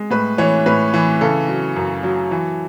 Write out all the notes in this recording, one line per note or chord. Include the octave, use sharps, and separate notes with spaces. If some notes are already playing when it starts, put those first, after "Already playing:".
Already playing: G#3
A2 B4
E3 C#5
A2 B4
E3
C#3 A4
F#3
F#2
F#3
E3